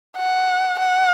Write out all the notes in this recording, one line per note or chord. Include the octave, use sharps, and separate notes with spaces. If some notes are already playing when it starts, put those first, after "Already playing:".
F#5
F#5